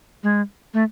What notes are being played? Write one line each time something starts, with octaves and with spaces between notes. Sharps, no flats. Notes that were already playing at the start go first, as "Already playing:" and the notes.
G#3
A3